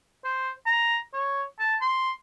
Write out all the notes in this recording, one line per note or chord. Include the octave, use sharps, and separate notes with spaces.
C5
A#5
C#5
A5
C6